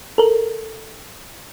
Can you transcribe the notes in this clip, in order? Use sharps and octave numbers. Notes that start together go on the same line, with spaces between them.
A4 A#4